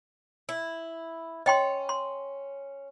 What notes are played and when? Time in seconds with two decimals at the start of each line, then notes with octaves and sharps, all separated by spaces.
0.49 E4
1.46 C#4 D#5 G5 C6
1.89 C6